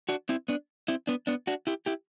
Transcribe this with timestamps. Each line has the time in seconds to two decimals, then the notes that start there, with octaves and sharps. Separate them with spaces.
0.09 D4 F#4
0.29 C4 E4
0.48 B3 D4
0.88 C4 E4
1.07 B3 D4
1.27 B3 D4
1.47 D4 F#4
1.67 E4 G4
1.86 E4 G4